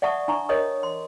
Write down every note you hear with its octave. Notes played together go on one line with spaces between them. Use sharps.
D5 E5 F#5 A5 C#6 D#6
D4 A#5 C#6
A#4 C#5 D#5 D#6
C6